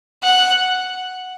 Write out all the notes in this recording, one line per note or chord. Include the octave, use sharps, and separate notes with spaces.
F#5